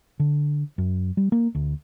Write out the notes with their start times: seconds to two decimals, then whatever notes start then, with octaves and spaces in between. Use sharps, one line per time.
0.20 D3
0.78 F#2
1.17 G3
1.32 A#3
1.55 D2